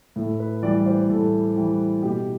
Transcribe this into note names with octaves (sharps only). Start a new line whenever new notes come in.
A2
B4
E3 G3 D5
C5
A2 A4
E3 G3
B2 G4